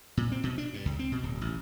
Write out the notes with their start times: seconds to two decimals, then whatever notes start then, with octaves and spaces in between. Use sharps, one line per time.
0.17 A#2
0.32 C4
0.44 B2
0.58 D4
0.74 G2
0.85 C#2
0.99 C4
1.12 B2
1.23 D1
1.41 A1